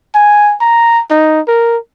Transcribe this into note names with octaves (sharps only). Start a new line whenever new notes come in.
G#5
A#5
D#4
A#4